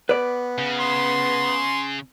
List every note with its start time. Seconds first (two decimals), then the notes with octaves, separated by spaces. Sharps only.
0.09 B3 B4 D5
0.58 C#3
0.80 C6